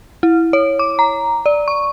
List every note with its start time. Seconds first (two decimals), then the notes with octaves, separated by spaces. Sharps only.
0.23 E4
0.53 C#5
0.79 D6
0.99 A#5
1.46 D5
1.68 C#6